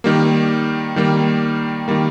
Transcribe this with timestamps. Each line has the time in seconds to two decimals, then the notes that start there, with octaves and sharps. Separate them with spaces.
0.04 D#3 G3 A#3
0.96 D#3 G3 A#3
1.88 D#3 G3 A#3